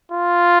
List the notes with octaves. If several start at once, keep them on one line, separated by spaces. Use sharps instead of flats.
F4